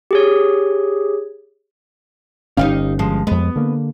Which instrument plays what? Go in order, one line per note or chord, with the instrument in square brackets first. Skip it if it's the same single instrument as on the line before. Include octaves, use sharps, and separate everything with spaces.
[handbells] G4 G#4 C#5
[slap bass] G1 C#4 [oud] D#4 G4 F5
[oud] F3 G#3
[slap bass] F2 G#3 [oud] B3
[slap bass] D3 A#3